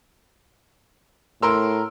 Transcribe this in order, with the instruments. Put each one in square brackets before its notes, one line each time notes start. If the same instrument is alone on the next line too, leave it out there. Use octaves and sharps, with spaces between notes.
[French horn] A2 [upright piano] A#4 C6 E6